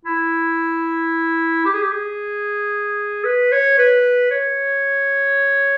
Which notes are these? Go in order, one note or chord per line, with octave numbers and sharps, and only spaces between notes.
E4
G4
G#4
G4
G#4
B4
C#5
B4
C#5